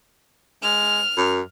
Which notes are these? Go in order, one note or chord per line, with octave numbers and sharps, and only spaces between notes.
G#3 F6
F#2